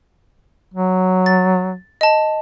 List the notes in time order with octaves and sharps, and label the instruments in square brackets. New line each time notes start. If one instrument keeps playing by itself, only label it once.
[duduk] F#3
[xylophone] A6
D#5 A5